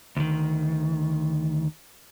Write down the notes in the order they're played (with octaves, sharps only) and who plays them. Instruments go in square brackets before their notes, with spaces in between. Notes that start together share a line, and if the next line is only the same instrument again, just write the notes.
[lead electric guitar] D2 D#3